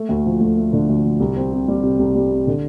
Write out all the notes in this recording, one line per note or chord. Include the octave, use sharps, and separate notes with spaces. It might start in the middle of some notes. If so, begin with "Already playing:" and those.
Already playing: A3
D2
F3
D2
A3
D3
D2
F3
C2
C4
C3
G3
C3
C2
G3
C3
D3